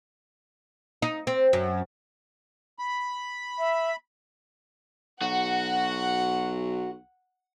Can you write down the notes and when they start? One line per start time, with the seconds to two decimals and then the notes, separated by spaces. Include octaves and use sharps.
1.02 D#4
1.27 C4
1.53 F#2
2.79 B5
3.59 E5
5.21 B1 F#4 F#5